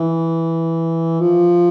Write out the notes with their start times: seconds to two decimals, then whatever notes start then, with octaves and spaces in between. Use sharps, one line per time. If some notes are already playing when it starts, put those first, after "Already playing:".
Already playing: E3
1.20 F3